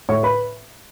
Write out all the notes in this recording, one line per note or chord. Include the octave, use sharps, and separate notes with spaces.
A2 C#5 C#6
B4 B5